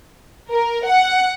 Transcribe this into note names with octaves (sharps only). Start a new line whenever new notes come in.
A#4
F#5